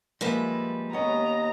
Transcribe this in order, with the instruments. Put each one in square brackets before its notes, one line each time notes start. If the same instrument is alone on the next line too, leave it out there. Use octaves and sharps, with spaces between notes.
[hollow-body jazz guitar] F3 G3 A#3 [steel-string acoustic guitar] G#3 B4 E5
[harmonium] D#2 D#5 [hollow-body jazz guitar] B3 C#4 [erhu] A#5